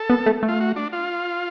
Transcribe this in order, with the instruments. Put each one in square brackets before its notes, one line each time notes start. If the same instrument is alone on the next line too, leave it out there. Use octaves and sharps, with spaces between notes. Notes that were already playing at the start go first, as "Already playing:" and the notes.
Already playing: [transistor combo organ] A4
[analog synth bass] B3
A3
A3
[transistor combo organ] F4
F#4
D4
F4